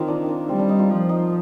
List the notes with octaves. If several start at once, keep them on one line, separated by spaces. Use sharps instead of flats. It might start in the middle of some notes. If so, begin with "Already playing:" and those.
Already playing: D#3 A#3 C4 F4
D4
D4
G3 C4
D4
D#4
F4
F3
D#4